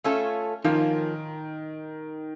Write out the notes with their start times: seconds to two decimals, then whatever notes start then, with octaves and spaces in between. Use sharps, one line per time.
0.04 A3 C#4 F4 A4
0.64 D#3 F3 A#3 C#4 F4